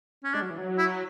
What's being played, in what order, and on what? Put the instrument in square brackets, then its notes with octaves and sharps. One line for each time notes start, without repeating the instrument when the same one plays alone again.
[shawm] C#4
[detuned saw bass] G#3 [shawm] D4
[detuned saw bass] F#3
E3
F#3
[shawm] E4